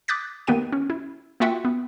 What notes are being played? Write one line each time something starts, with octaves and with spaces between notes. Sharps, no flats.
D6 D#6 F#6 G6 A6 B6
D#3 A#3 B3 G4 G5 D#7
C#4
E4
A#3 F4 F#4 E5 F#5 G5
B3